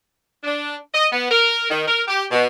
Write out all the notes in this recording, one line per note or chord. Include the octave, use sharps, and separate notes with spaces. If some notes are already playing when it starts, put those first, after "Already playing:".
D4
D#5
B3
A#4
D#3
A#4
G4
B2